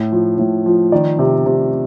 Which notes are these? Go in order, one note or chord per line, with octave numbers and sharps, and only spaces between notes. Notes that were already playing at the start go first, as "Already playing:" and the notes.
Already playing: A2
F3
A2
F3
D#3 D5
C3
C3